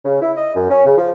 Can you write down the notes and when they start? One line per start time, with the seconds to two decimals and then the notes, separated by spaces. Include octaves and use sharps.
0.05 C#3
0.22 E4
0.36 D#5
0.55 F#2
0.70 C#4
0.86 C#3
0.98 F3